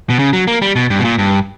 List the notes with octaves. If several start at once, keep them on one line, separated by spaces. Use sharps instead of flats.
B2
C#3
F#3
A#3
G3
B2
G2
B2
A#2
G2